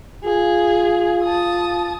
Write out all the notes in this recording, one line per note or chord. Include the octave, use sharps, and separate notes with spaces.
F4 G#4
A5 D#6